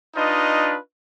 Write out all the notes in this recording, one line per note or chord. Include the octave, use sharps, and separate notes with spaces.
D4 D#4 F4 B4 D#5